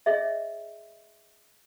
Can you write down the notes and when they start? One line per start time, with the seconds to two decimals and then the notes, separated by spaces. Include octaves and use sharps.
0.06 G#4 C#5 D#5 E5